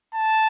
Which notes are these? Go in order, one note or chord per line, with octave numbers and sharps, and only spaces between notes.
A5